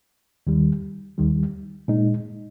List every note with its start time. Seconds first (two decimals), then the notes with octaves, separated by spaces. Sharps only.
0.47 D#2 D#3 G3
1.18 D#2 D#3 G3
1.88 A#2 G#3 D#4